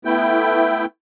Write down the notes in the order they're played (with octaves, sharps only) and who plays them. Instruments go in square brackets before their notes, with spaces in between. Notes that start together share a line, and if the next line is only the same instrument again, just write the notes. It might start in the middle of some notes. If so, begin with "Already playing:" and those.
[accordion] A3 B3 E4 G5